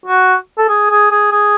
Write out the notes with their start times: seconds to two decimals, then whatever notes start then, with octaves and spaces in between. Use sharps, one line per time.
0.06 F#4
0.57 A4
0.69 G#4
0.90 G#4
1.11 G#4
1.32 G#4